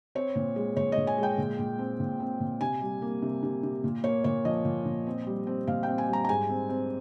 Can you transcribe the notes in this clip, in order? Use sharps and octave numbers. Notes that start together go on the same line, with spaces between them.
C4 C#5
A#2
G#3
A#2 C#5
D#5
A#2
G#5
G#3
G5
A#2
A#2
C4
A#2
C4
A#2
C3 G#5
G3
A#3
C3
C3
C3
A#2
A#3 C#5
A#2 C#5
F3 D#5
A#2
A#2
C4
G3
C4
A#2 F5
C4 G5
G#5
G3 A#5
A#5
G#2 G#5
C4
C4